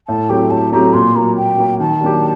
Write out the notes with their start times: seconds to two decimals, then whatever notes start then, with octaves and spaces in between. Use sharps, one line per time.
0.08 A2 A5
0.29 F#3 A3 C4 G4 G5
0.51 A2 A5
0.73 F#3 A3 C4 G4 A#5
0.94 A#2 C6
1.15 F#3 A#3 A#5
1.36 A#2 G5
1.58 F#3 A#3
1.80 D#3 A5
2.01 F#3 A#3 D4 G4